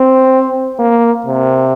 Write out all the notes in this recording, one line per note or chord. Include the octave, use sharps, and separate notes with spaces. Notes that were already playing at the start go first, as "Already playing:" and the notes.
Already playing: C4
A#3
C3